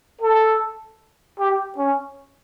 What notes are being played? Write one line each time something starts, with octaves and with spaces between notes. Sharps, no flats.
A4
G4
C#4